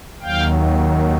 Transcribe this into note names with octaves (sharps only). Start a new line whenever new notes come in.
D#2 D#3 F#3 F5 G5